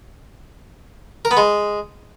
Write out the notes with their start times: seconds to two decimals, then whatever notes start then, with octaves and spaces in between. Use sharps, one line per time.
1.25 A#4
1.31 B3
1.37 G#3